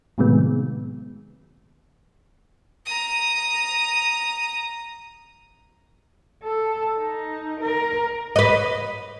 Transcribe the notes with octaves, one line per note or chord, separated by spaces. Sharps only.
A2 C3 D#3 F#3 G#3 B3
A#5 D#6
A4
D#4
A#4
B4 D#5